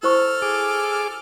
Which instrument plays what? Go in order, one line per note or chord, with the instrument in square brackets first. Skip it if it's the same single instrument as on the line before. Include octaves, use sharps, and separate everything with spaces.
[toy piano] E4 C5 C#6 [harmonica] A4 F6
[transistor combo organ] G#4 D6